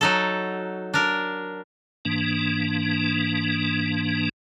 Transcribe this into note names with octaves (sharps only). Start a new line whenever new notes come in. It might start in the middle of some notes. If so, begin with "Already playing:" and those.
F#3 D#4 A4
D4 A#4
G#2 E3 A#3 D4